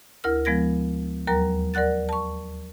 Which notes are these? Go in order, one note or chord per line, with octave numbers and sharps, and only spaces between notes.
D2 E4 A#4 F6
F3 G#3 B3 G#6 A#6
D#2 F#3 A#4 A#5
A#4 D5 F#5 F#6 A6
A5 C#6